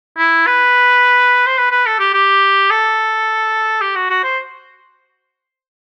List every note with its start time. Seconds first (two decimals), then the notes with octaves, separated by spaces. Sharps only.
0.18 E4
0.47 B4
1.47 C5
1.58 B4
1.72 B4
1.86 A4
2.00 G4
2.14 G4
2.71 A4
3.81 G4
3.96 F#4
4.10 F#4
4.24 C5